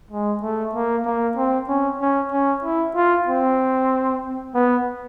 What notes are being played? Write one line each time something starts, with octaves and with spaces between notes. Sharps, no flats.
G#3
A3
A#3
A#3
C4
C#4
C#4
C#4
E4
F4
C4
B3